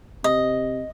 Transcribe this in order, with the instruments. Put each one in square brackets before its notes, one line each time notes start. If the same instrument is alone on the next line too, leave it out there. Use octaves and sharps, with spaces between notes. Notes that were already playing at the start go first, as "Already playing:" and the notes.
[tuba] C3 [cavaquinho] D#5